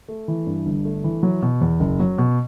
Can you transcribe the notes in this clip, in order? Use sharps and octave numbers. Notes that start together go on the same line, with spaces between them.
A3
E3
G2
G1
A3
E3
F#3
B2
E2
F#1
F#3
B2